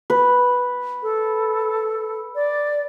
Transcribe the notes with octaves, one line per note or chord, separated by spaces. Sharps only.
B4
A4
D5